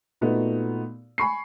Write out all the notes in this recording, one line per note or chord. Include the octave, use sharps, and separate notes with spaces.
A#2 A3 B3 D#4 F#4
G#5 B5 C#6 C7